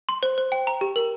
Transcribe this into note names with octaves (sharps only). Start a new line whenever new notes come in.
C6
C5
C5
G5
A#5
G4
A#4